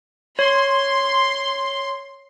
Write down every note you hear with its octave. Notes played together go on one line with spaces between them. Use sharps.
C#5 C6